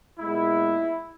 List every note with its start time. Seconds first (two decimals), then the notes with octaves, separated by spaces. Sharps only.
0.19 A#2 G#3 B3 E4